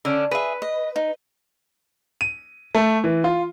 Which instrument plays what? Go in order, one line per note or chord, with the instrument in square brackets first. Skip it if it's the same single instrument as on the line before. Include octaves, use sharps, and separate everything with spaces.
[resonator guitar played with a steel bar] D3 C#4 D4
[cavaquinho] G#4 E5 [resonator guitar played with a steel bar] B4
[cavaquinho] D#5
D#4
[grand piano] D#7
A3
E3
F4